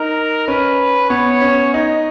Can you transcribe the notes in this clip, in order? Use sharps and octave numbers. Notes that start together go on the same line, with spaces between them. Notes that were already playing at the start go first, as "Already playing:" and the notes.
Already playing: D#4 A#4
C#4 B4
B3 C#5
C#4
D#4 D#5